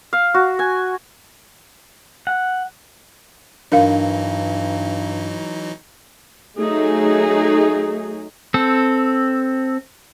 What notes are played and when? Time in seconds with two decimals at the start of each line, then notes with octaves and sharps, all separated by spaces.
0.13 F5
0.34 F#4
0.59 G#5
2.27 F#5
3.72 G2 E3 F#3 D4 D#4 A#4 F5
6.58 F#3 A3 D#4 G#4
8.54 C4 A4